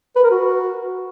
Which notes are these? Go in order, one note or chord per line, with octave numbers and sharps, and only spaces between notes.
B4
A#4
F#4